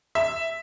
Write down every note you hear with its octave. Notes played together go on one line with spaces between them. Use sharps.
E5